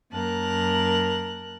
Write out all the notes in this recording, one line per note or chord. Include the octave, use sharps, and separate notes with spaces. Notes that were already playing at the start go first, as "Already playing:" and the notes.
F#2 A#3 A#4 A5 F#6